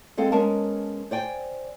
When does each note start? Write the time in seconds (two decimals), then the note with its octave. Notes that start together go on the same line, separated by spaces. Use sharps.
0.17 G#3 C4 A4 F5
0.32 G#3 B3 C#4 A#4 A5
1.11 C5 D5 G5 G#5